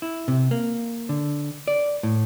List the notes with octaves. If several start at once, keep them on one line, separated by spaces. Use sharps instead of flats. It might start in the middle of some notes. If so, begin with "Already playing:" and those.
E4
C3
A#3
D3
D5
A2